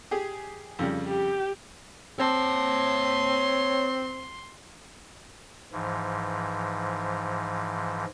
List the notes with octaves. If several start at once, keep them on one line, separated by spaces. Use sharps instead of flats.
G4 G#4
F2 C#3 G3
G4
C4 C#5 A5 C6
G#2 E3 F3